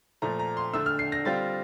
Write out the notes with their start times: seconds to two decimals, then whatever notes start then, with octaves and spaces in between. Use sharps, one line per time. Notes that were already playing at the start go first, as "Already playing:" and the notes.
0.22 A#2 F3 A3 A#5
0.39 A#5
0.57 C6
0.73 D3 A3 D4 E6
0.86 F6
0.99 C7
1.12 A#6
1.25 D3 G3 C4 F4 A6